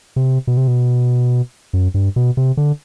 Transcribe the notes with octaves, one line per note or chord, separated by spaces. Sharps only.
C3
B2
C3
B2
F#2
G2
B2
C3
D3